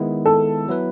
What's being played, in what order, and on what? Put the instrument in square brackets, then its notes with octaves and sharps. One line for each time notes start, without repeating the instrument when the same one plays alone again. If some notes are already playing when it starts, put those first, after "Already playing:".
Already playing: [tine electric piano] D#3 G#3 B3 E4
[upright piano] A4
[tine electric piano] F#3 B3 E4 B4